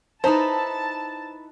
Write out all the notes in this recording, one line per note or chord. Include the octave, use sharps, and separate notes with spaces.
D#4 E4 A4 B4 C5 A5 A#5